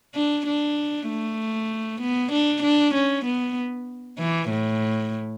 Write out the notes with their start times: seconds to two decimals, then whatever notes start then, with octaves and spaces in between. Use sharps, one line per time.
0.15 D4
0.46 D4
1.08 A3
2.01 B3
2.32 D4
2.63 D4
2.95 C#4
3.25 B3
4.19 E3
4.50 A2